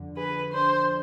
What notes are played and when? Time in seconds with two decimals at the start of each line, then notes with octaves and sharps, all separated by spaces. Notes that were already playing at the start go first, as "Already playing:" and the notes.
Already playing: F2 D3
0.17 G#4 B4
0.53 D4 C5